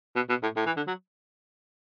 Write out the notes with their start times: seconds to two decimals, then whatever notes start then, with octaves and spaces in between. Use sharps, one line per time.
0.16 B2
0.29 B2
0.43 A2
0.56 A2
0.66 E3
0.77 D3
0.87 F#3